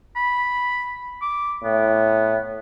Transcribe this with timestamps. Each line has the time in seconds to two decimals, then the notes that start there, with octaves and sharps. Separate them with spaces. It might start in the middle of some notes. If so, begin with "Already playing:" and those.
0.16 B5
1.22 D6
1.64 A2 B3